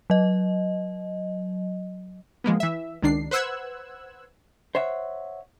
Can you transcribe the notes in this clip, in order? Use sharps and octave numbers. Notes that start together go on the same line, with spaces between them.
F#3 D#5
F3 G#3 A#3 B3
E3 E5
C#2 D#3 D4 C7
B4 C5 F#5 E6 F#6 G#6
C5 C#5 E5 F#5